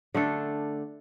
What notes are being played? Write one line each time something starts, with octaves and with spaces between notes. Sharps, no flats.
D3 A3 D4 A4